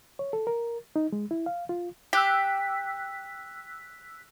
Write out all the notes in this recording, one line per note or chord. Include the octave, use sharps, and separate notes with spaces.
C#5
A4
A#4
D#4
G#3
E4
F5
F4
G4 E6 F#6 B6